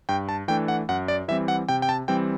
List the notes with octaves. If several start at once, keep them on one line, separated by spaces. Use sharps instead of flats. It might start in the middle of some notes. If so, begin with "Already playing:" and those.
G2 G5
A5
E3 A3 D4 G5
F#5
F#2 F#5
D5
E3 G3 C4 E5
F#5
C3 G5
G5
A5
E3 G3 C4 G5